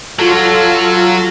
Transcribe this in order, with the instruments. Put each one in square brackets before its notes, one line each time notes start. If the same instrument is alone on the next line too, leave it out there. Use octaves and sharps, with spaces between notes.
[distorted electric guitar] F#3 [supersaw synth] F4 A4